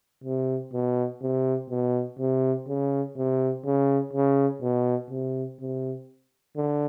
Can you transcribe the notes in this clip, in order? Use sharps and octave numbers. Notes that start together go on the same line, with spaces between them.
C3
B2
C3
B2
C3
C#3
C3
C#3
C#3
B2
C3
C3
D3